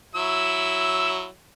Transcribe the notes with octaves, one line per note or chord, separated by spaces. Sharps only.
F#3 E4 E6